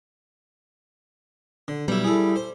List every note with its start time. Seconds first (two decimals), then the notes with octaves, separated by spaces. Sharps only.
1.68 D3
1.88 B1 G3 E4
2.04 E4 G#4 A4
2.36 C5